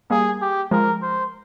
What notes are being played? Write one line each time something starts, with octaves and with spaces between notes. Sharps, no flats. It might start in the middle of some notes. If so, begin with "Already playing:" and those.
G3 A#3 G#4
G4
F3 G#3 A#4
C5